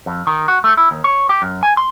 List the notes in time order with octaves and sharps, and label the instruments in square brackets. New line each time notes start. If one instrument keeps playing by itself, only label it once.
[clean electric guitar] F2
D#3
F#4
A3
E4
D#2
C#5
G4
F#2
G#5
C6